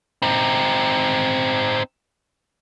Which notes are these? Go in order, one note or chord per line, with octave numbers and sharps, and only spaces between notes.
C4 D#4